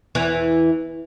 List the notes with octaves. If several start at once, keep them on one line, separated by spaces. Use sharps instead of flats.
E2 E3